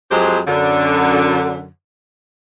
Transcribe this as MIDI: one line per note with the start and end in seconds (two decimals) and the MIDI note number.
0.11 0.40 41
0.11 0.40 54
0.11 0.40 56
0.11 0.40 67
0.11 0.40 72
0.47 1.67 42
0.47 1.67 50